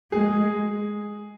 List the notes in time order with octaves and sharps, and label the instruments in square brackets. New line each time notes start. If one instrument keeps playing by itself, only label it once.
[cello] G#3 [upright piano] G#4